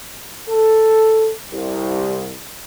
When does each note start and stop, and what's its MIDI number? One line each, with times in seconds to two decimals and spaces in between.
0.50 1.31 69
1.51 2.33 36